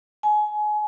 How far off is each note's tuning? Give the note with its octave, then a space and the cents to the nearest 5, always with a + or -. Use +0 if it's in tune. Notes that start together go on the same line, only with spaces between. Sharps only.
G#5 +25